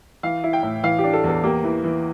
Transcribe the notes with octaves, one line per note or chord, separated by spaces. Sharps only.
E3 F5
E4
G5
A2
E3 F5
G4
D4
A4
E2
A4
A#3 G4
E3
E3